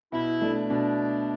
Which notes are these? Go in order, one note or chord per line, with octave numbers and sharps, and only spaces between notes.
B2 E4
A3 D4
B2 D4